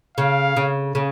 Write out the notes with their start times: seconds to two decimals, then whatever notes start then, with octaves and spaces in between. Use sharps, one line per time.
0.17 C#3 F5
0.56 C#3
0.95 C#3